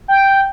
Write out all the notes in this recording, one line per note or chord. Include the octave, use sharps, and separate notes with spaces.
G5